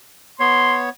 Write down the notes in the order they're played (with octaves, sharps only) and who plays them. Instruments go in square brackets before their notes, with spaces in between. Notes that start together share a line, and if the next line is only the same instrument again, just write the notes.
[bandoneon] B3 C#5 [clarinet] C6